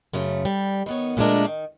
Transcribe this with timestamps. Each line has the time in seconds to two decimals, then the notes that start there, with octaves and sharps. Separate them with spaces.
0.13 F#2 C#3 A3
0.45 G3
0.86 D#3 B3 C#5
1.17 A#2 D3 G#3 A3 D4 A#4
1.45 D#3